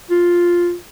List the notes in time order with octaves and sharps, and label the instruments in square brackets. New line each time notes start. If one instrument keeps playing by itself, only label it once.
[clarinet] F4